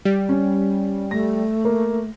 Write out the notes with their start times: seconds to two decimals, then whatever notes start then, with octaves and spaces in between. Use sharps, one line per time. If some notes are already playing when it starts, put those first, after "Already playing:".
0.05 G3
0.29 C#4
1.11 A3 A#6
1.65 A#3